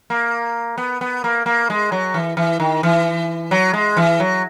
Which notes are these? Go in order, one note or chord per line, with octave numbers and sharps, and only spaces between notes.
A#3
B3
B3
A#3
A#3
G#3
F#3
E3
E3
D#3
E3
F#3
G#3
E3
F#3